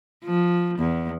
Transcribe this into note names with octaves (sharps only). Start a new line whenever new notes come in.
F3
E2